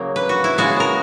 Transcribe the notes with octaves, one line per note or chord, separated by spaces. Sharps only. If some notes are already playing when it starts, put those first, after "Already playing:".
Already playing: C#3 F#3 A#3
B4
F#4
E4
C#3 G#3 B3 F#4
A#4